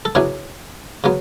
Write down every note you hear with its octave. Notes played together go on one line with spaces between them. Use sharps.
A4
C#3 F#3 B3 D4 E4 G#4
C#3 F#3 B3